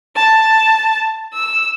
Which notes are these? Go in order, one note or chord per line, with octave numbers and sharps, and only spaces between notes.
A5
E6